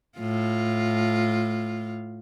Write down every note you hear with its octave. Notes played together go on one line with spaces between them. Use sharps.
A2 F4